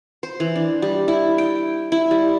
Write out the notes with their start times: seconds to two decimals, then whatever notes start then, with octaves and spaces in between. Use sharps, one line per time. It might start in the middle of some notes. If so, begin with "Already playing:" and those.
0.23 C5
0.40 E3
0.55 D4
0.82 G3
1.08 E4
1.38 G5
1.92 E4
2.11 G3